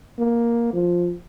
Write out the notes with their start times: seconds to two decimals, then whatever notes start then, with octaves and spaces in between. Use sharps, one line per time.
0.19 A#3
0.73 F3